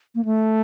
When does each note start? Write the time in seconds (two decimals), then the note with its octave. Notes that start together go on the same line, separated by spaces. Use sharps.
0.15 A#3
0.25 A3